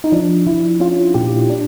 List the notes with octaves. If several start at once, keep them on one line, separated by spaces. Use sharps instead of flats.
D#4
F3 D4
F3 E4
C#4 F4
A#2 G4
D4